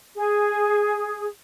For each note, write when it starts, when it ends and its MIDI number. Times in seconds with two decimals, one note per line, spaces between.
0.16 1.28 68